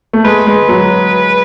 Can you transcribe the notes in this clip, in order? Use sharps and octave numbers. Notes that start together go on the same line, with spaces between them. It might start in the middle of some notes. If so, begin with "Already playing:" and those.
A3
G#3 B4
G#3
F#3